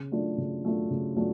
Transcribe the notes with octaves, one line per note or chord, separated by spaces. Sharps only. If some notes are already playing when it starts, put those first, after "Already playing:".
Already playing: C#3
F#3 A3 D4 F4
C#3
F#3 A3 D4 F4
C#3
F#3 A3 D4 F4